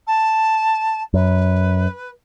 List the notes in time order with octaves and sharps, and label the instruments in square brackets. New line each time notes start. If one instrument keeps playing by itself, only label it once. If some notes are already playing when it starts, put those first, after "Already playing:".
[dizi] A5
[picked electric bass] F#2 [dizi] B4